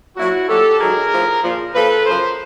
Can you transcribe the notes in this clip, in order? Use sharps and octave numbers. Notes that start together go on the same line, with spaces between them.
A#2 F#3 E4 F#4
A#2 F#3 G4 A4
G#2 D#3 F#3 G#4 A#4
A2 F3
A#2 F3
A#2 F3 A4 B4
F#2 C#3 F3 A#4 C5